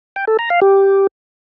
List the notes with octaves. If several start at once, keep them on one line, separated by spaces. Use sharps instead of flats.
G5
A4
A#5
F5
G4